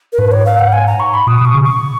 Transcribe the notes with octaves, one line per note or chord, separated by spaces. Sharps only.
A#4
G#2 B4
C#5
F5
F#5
G#5
A#5
C#6
B5
A#2 D#6
B2 C#6
C#3
C#6